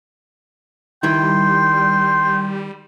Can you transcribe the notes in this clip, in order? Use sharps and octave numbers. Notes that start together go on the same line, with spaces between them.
D#3 G3 E4 G5 C6